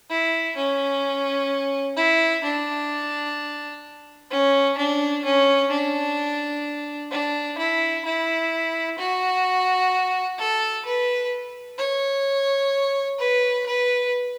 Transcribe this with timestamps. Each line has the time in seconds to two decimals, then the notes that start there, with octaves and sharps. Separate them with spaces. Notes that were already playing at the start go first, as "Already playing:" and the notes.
0.10 E4
0.57 C#4
1.97 E4
2.44 D4
4.30 C#4
4.78 D4
5.24 C#4
5.71 D4
7.11 D4
7.58 E4
8.05 E4
8.98 F#4
10.38 A4
10.85 B4
11.78 C#5
13.18 B4
13.66 B4